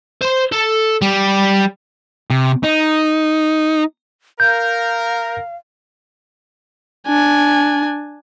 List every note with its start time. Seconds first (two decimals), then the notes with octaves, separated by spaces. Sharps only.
0.21 C5 C6
0.52 A4
1.02 G3
2.30 C3
2.63 D#4
4.40 A#4 F5 G6
7.07 D4 G#5